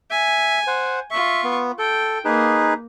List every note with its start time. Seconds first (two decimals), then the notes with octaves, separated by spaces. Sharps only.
0.11 E5 G#5
0.67 C5 F#5
1.11 F4 E5 C#6
1.44 B3
1.79 A4 G5
2.25 A#3 D#4 G#4 B4